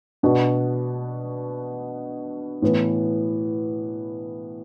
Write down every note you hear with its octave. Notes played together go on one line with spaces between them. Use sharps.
B2 B3 D4 F#4
A2 E3 B3